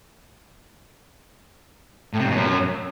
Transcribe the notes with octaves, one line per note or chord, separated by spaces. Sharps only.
A2
C3
G2
B2
F#2